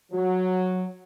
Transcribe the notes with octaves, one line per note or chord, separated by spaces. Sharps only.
F#3